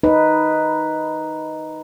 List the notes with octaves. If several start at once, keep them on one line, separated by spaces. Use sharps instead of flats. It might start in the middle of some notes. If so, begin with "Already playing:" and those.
D#4 B4